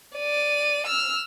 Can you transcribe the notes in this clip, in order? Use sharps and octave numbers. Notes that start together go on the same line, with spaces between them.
D5 D#7
E6 F6